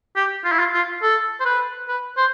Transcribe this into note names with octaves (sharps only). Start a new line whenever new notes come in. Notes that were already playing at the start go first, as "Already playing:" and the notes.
G4
F4
E4
F4
F4
A4
C5
B4
B4
C5